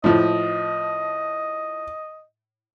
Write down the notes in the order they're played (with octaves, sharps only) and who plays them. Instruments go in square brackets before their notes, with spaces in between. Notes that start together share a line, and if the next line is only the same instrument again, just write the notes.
[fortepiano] A2 F3 [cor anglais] D#5